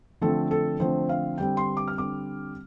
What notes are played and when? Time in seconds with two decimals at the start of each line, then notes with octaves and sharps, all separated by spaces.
0.22 D3 F3 A3 C4 A4
0.51 A4
0.80 D3 F3 A3 C4 C5
1.09 F5
1.38 D3 G3 C4 G5
1.57 C6
1.77 D6
1.88 F6
1.96 D3 G3 C4 D6